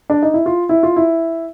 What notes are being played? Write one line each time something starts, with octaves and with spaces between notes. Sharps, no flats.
D4
D#4
E4
F4
E4
F4
E4